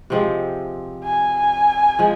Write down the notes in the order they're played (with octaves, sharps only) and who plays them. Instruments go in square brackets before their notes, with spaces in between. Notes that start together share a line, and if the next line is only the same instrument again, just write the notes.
[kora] C3 F3 G#3 C4
[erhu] G#5
[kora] F3 G#3